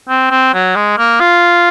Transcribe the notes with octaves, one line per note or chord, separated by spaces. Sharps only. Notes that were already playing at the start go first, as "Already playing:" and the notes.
C4
C4
F#3
G#3
A#3
F4